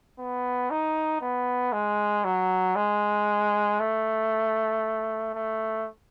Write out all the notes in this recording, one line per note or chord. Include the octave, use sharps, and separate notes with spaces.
B3
D#4
B3
G#3
F#3
G#3
A3
A3